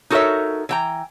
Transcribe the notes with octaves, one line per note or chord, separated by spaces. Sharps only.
D#4 F#4 A4 A#4 C#5 E5
E3 G5 A#5